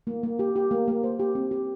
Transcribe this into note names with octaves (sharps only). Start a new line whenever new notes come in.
A#3
A#3
G4
G4
A#3
A#3
C5
G4
C4
G4